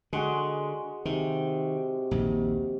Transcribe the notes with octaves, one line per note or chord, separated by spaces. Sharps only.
D3 G#3 F#4 G#4
C3 D#3
A#1 D#2